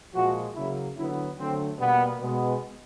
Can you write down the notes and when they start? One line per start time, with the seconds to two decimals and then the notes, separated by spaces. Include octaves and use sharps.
0.14 A#2 F3 G#3 F#4
0.55 C#3 F#3 A#3 E4
0.96 D3 F#3 B3 E4
1.38 D3 F#3 A3 C4
1.79 B2 G3 A#3 B3
2.21 B2 G#3 B3